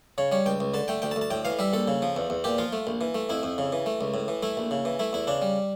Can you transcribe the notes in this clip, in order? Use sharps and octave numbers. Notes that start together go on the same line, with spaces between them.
C#3 C#5
G3 C#5
C#2 G5
C#2
D3 A5
A3 G5
D2 G5
A5
D2
A5
A2 G5
E3 F5
G3 E5
A#1 A4
C#3
F3
E2
E2
A#2 G4
F3 F4
A3
A#1
E3
A3
F2 E4
F2
C#3
E3
A3
C#2
A2
E3
A3 E4
A#1
C#3
E3
A3 E4
E2 E4
C#3 D4
G3